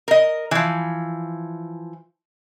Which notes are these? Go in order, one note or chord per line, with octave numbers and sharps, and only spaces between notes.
A#4 D#5
E3 F3